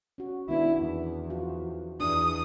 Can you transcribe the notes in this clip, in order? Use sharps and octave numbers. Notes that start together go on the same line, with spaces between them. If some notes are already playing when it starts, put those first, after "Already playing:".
C#4 F#4
D#3 B3 D4 E4
E2
F3 F4 F#4
E2 D4 D#6